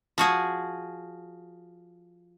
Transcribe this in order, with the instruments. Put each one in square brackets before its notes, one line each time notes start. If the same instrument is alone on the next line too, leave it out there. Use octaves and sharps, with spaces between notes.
[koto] F3 F#4 G#4